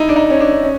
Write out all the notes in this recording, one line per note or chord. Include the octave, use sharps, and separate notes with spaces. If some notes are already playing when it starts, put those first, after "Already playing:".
Already playing: D#4 E4
D4
D#4
C#4
D4
C#4